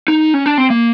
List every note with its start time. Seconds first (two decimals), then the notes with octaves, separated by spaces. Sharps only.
0.08 D#4
0.34 C#4
0.46 D4
0.58 C4
0.70 A#3